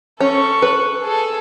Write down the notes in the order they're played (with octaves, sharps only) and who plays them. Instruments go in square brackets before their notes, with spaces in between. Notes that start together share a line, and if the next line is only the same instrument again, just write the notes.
[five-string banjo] C#4 [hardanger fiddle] A4 C#6
[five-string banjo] B4
[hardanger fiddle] G#4 A4